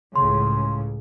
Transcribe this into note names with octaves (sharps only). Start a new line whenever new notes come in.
C#2 A2 C#3 C6